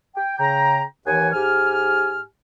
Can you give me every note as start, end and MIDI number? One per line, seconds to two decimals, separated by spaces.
0.16 0.34 79
0.39 0.82 49
0.39 0.82 79
0.39 0.82 82
1.07 1.32 39
1.07 1.32 52
1.07 1.32 73
1.07 1.32 78
1.07 1.32 80
1.33 2.22 44
1.33 2.22 67
1.33 2.22 80
1.33 2.22 89